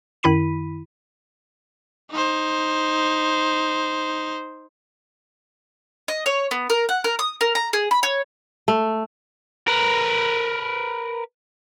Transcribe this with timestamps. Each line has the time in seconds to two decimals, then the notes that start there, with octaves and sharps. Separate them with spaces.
0.23 F#2 D#3 E4 B5 B6 D#7
2.11 D#4 C5
6.08 D#5
6.26 C#5
6.51 B3
6.70 A#4
6.89 F#5
7.04 A#4
7.19 D#6
7.41 A#4
7.55 A#5
7.73 G#4
7.91 B5
8.03 C#5
8.68 A3
9.68 A#4 B4